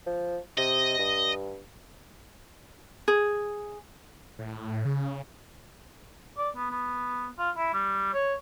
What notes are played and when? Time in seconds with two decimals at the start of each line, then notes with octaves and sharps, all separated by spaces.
0.06 F3
0.58 C3 D#5
0.99 G2
3.08 G#4
4.39 A2
4.85 C#3
6.38 D5
6.56 B3
6.71 B3
7.39 F4
7.57 E4
7.74 G3
8.14 C#5